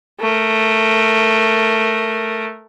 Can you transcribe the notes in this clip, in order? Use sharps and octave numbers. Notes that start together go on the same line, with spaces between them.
A3 A#4